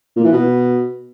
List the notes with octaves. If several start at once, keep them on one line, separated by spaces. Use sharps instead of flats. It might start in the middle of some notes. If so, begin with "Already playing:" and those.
A#2
E3
B2